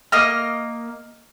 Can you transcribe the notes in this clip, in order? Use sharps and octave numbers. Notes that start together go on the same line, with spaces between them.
A#3 D#5 F6